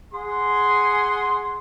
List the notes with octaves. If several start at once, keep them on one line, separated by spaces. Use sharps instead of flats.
G#4 F#5 G#5 C6